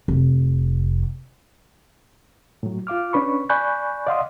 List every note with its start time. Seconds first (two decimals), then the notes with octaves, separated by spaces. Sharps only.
0.08 F1
2.63 A2 F#3
2.87 F4 F5 D6 F6
3.13 C#4 D4 B4 B5 C#6
3.49 D5 G#5 B5 C#6 F#6 G6
4.07 D5 D#5 F5 F#5 C6 D#6